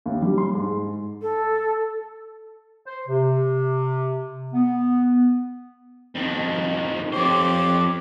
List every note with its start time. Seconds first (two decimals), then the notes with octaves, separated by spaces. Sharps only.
0.06 D#2
0.22 G3
0.38 C6
0.55 G#2
1.21 A4
2.86 C5
3.07 C3
4.53 B3
6.15 F2 D#3
7.12 F2 G4 C5 C#5 D6